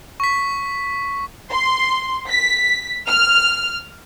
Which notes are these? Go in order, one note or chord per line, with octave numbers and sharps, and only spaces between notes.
C#6 B6
C6
B6
F6